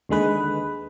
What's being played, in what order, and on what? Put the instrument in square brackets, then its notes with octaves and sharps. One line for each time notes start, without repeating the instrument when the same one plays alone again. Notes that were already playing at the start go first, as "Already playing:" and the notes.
[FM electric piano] D#2 D3 G#3 B4